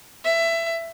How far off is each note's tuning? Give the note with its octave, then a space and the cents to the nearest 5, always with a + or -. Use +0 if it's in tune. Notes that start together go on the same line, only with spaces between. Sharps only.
E5 +20